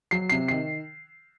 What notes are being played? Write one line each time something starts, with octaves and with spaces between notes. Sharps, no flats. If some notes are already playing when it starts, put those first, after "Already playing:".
F#3 C7
C3 C7
D#3 C7